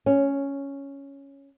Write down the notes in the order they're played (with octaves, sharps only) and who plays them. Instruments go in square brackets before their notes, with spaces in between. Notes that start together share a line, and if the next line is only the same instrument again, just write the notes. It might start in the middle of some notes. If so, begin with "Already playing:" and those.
[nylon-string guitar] C#4